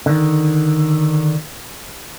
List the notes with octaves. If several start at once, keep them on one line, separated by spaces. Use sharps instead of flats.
D3 D#3